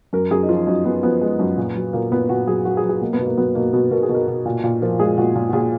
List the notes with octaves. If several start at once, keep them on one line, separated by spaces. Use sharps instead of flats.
F#2 A#4
F#2 G#4
D#4
F3 F4
F#2 D#4
F#2 B3
F3 B3
G#3
F#2
A#2
F#3
A#2 A#3
A#2 B3
A#2 F#4
F#3 G#4
F#3 F#4
G#4
F#3
G#4
B2 A#3
B3
B2
A#3
F#3 B3
B2 A#3
B2 B3
B2 A#4
G#4
B2
A#4
B2
A#2
A#2
F3 A#4
G#3 G#4
A#2 F#4
A#2
F#4
A#2 G#4